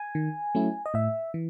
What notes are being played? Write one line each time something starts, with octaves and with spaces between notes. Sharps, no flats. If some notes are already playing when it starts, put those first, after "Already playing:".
Already playing: G#5
D#3
F#3 A3 C#4 E4
D#5
A2 E5
E3